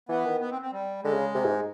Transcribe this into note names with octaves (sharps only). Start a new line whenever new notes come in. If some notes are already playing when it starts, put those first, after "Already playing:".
E3 B3
D#3
B3
C4
C4
G3
D3 G#3
C#3
C3
G#2